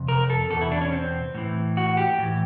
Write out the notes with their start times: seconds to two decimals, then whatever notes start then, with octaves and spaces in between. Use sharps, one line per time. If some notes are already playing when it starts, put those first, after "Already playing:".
Already playing: F2 C3
0.08 A#4
0.30 A4
0.50 E2 B2 A4
0.61 E4
0.72 D4
0.82 C#4
0.92 C4
1.35 A2 E3
1.77 F#4
1.97 G4
2.18 A2 E3